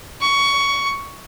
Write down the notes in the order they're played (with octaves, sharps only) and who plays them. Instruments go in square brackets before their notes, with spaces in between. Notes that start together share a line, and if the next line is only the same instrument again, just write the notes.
[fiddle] C#6